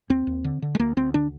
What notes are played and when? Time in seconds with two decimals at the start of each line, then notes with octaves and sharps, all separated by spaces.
0.10 D#2 C4
0.27 D#2
0.44 D3
0.62 D3
0.75 G#3
0.79 D2 A#3
0.97 D2 C4
1.14 D3 D4